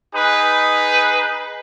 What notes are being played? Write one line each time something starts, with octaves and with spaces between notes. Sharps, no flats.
D#4 G#4 B4